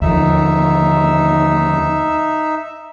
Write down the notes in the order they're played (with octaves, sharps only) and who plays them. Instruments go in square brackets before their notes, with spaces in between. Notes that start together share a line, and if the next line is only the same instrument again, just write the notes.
[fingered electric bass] D#2 D3 F3 [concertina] D#4 E5